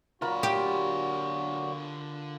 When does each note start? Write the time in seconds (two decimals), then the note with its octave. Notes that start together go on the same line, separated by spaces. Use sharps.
0.22 A#2 D3 F#3 F4 F#4 A#4 B5
0.43 G4